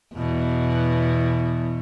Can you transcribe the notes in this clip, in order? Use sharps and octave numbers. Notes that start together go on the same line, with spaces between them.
E2 B2